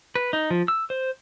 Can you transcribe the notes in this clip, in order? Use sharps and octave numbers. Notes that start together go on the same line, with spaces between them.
B4
D#4
F3
E6
C5